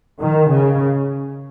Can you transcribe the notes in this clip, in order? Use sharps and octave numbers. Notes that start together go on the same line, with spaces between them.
D#3
C#3